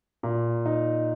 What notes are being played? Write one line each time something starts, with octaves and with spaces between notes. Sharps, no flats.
A#2
D#4